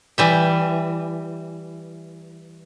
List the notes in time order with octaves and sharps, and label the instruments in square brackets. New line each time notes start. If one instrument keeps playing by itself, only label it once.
[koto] E3 G3 E5